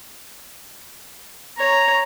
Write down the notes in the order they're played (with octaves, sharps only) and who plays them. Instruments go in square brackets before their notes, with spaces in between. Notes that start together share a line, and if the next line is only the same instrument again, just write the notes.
[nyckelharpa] C#5 [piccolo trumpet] A#5